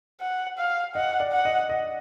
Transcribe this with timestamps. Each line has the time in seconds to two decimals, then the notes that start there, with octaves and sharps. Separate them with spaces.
0.21 F#5
0.58 F5
0.95 D#5 F#5
1.20 D5
1.32 F#5
1.45 D#5
1.69 D#5